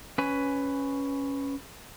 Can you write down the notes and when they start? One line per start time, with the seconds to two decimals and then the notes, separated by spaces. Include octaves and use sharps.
0.18 C#4 B4 G#5